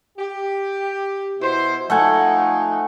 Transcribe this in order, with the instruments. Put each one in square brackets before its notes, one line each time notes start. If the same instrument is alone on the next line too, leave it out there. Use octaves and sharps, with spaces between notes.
[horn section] G4
B2 E4 C5
[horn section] F3 D#4 [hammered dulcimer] A3 F#5 G#5